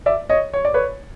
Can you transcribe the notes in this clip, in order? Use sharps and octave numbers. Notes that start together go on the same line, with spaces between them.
D5 E5
C#5 D#5
C#5
D5
B4 C#5